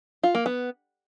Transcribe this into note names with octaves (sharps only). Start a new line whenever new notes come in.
F4
A#3
B3